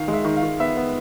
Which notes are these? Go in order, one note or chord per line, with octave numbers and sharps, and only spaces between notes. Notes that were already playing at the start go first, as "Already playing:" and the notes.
Already playing: D#3 F5
G#3
E5
D#3
F5
D#3
B3 E5
B3